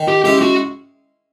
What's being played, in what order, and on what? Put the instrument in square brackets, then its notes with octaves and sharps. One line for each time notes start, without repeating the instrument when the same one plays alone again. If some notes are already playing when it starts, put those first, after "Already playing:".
Already playing: [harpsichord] D#3
[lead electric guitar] G4
[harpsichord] G#3 C#4 E4 [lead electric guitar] G4
[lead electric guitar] F#4